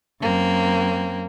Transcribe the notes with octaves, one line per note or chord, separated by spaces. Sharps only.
F#2 A#3 C4